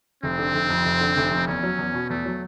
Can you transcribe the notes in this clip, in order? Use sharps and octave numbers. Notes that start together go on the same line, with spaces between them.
F1 C4
D3
F1
F2
F1
D3
F1
F2
E2 C#4
F#3
E2
B2
E2 A3
F#3